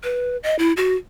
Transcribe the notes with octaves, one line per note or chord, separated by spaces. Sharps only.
B4
D#5
E4
F#4